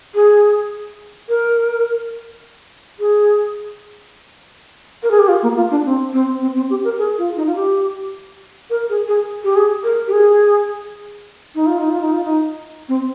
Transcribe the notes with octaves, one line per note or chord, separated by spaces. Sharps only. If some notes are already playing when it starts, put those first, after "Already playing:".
G#4
A#4
G#4
A#4
G#4
G4
F4
A#3
F4
D4
C4
C4
C4
C4
G4
A#4
G#4
F4
D#4
F4
G4
A#4
G#4
G#4
G4
G#4
A#4
G4
G#4
D#4
F4
D#4
F4
D#4
F4
D#4
C4